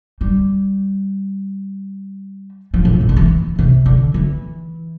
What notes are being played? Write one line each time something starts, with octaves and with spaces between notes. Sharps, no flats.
G3
F3
A2
B2
C3
D3
E3
C3
D3
E3